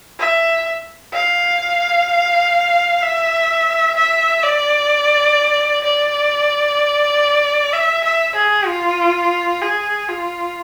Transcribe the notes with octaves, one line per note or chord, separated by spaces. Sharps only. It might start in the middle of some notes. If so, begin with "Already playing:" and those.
E5
F5
E5
E5
D5
D5
E5
E5
G#4
F4
G#4
F4